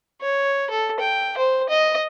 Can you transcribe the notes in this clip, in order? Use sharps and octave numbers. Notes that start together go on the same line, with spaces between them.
C#5
A4
G5
C5
D#5